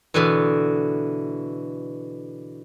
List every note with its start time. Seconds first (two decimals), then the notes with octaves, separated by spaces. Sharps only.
0.14 B2 D3 E3